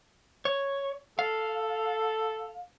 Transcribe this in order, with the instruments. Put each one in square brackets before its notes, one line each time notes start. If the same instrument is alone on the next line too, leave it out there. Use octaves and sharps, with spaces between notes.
[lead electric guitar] C#5
[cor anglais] A4 [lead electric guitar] F5